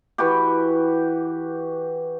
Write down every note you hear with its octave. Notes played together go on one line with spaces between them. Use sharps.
E3 F#4 G4